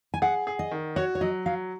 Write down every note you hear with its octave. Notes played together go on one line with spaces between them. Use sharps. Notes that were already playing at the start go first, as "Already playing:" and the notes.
G#5
G#4 F#5
G#4
D#5
D#3
F#4 C#5
C#5
F#3 D#5
F#3 F5